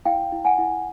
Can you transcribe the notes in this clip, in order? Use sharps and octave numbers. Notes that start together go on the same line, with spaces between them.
E4 F5 G5
E4
F#5 G#5
E4